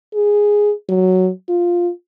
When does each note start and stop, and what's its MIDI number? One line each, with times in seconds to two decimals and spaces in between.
0.14 0.72 68
0.89 1.30 54
1.49 1.90 65